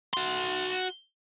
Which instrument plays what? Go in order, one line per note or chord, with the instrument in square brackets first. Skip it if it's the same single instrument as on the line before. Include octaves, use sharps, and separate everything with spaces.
[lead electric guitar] F#4 C6